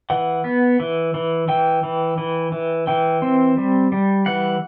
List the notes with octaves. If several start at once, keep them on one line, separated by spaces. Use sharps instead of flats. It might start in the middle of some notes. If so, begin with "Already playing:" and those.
E3 F#5
B3
E3
E3
E3 G5
E3
E3
E3
E3 G5
C4
G3
G3
E3 F#5